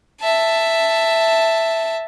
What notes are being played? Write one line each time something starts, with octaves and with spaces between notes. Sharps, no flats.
E5 A5